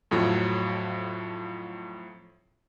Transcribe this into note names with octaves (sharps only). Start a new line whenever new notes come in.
F2 A2 F3 F#3